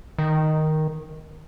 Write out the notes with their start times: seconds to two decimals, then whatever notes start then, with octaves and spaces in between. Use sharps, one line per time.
0.19 D#3